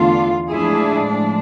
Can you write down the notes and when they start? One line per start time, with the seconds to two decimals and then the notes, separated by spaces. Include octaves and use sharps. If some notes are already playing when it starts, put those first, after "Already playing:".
Already playing: E2 D3 A3 D4 F4
0.50 A2 F3 G#3 D4 E4 G#4